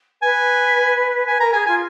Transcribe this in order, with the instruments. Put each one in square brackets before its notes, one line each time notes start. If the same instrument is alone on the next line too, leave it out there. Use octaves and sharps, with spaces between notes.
[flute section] B4 [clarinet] G#5
[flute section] B4 [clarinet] G#5
[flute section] A#4 [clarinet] A#5
[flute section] G#4 [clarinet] G#5
[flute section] F4 [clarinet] G#5